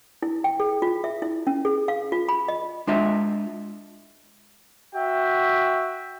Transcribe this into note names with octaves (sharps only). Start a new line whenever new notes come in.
E4
G5
G#4
F4
E5
E4
C#4
G#4
F5
F4
B5
D#5
G#3 D4 F4 D#5 E5
F#4 E5 G5